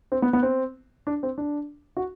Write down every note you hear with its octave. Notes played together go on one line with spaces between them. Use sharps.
C4
B3
B3
C4
D4
C4
D4
F#4